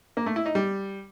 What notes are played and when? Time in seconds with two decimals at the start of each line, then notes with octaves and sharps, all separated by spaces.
0.17 A#3
0.26 A3
0.36 E4
0.46 D#4
0.55 G3